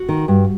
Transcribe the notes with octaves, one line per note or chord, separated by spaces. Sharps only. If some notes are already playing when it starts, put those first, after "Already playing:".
Already playing: F#4
D#3
G2